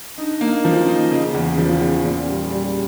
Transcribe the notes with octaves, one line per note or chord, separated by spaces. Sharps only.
D4 D#4
A#3
F3 C#4
D#4
C#3
E2
F3
E2
A#2 C#4
G3
G3